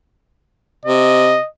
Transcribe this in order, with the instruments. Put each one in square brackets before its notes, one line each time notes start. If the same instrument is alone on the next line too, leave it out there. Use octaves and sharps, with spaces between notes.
[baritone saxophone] C3 [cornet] D#5